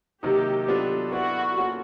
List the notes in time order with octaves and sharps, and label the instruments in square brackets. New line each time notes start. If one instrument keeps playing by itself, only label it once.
[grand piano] C3 D#3 F#3 A#3 D#4 [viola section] G4
[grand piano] F#3 B3 D4 F4 A4
[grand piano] B3 E4 A4 D5 [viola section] F#4
[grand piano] A#3 C#4 F4 A4